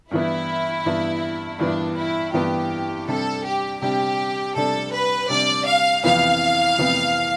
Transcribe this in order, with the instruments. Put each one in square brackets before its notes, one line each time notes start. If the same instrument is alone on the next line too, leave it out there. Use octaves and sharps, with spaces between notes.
[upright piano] G2 E3 B3 [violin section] E4
[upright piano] G2 E3 B3
[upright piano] G2 E3 B3 [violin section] D4
[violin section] E4
[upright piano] G2 E3 B3 [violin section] G4
[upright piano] C3 G3 D4 [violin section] A4
[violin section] G4
[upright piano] C3 G3 D4 [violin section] G4
[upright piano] C3 G3 D4 [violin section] A4
[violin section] B4
[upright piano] C3 G3 D4 [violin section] D5
[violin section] F5
[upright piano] F2 C3 E3 B3 [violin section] F5
[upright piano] F2 C3 E3 B3